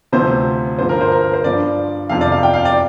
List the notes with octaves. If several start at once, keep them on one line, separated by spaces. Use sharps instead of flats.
D2 C3 F3 C5
G2 D3 F3 C5
A#4
C5
A#4
C5
G2 D3 F3 D5
F2 C3 F3 F5
D5
F5
G5
F5
D5